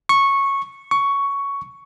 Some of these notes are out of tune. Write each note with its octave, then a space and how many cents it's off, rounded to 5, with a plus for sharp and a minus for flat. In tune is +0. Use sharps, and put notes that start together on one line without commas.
C#6 -10
C#6 +10